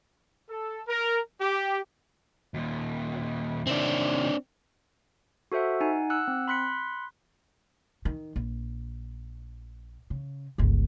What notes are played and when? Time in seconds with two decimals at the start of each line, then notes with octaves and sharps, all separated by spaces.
0.50 A4
0.87 A#4
1.40 G4
2.54 D#2 A#2
3.67 C3 D#3 C4 D4
5.52 F#4 A4 C5 E5 F#5
5.81 D#4 F#5 G#5
6.10 F#5 E6 F#6
6.28 C4
6.48 B5 C6 F#6 B6 C#7
8.05 D#3
8.36 A#1
10.10 C#3
10.58 G1 C#2